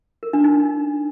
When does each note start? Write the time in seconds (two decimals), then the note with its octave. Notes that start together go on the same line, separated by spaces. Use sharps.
0.23 A#4
0.33 D4
0.44 D#4